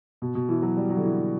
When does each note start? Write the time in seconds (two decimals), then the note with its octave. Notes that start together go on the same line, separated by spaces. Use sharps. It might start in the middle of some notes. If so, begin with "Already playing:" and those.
0.22 B2
0.35 B2
0.49 E3
0.62 F#3
0.77 G3
0.90 F#3
0.97 D3
1.04 E3